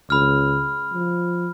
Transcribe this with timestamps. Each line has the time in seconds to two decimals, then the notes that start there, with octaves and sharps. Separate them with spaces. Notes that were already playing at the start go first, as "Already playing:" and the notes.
0.10 C#2 B5 F6
0.94 F3